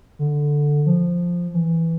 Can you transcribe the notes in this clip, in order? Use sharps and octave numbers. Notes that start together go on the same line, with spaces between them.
D3
F3
E3